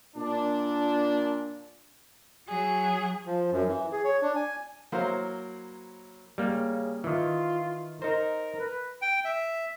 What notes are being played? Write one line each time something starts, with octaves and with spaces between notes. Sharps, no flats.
A#2 D4
F#3 G#4
F3
F#2
E3
G#4
C#5
D4
G#5
F#3 A#3 E4 A#4 C5 F5
C#3 G3 A#3
D#3 E3 F4
D#4 A#4 C5
B4
G5
E5